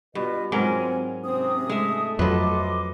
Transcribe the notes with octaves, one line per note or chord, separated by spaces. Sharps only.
G2 B2 F4 B4 D#5
G#2 F#3 C4 F4 A#4 G#5
C3 C4 C#4 D#6
G#3 A3 E5
F2 F#3 A4 B4 D#5 C6 D6